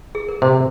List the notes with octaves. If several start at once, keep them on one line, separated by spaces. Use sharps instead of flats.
G#4
A#4
C3 C5